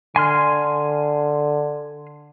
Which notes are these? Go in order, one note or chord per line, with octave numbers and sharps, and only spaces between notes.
D3 G#5 C6 F6